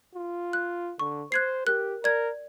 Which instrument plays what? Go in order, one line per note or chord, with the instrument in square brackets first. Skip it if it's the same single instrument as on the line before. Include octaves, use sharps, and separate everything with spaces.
[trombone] F4
[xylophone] F#6
[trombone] D3 [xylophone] C#6
[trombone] C5 [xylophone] F#6 G#6 C7
[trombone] G4 [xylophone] A#4 F#6
[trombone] A#4 [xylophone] D5 G#6